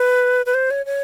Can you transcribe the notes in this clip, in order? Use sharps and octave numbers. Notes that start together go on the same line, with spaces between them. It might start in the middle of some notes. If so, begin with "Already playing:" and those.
Already playing: B4
B4
C5
C#5
C#5